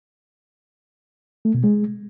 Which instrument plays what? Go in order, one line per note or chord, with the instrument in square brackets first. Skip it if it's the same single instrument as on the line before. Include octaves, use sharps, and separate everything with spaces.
[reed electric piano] A3
B2
G#3